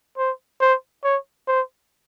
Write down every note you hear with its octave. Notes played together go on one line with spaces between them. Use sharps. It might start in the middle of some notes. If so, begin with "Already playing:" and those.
C5
C5
C#5
C5